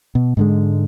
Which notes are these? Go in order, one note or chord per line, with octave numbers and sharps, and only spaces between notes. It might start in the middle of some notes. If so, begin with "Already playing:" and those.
B2
G#2 D3 G#3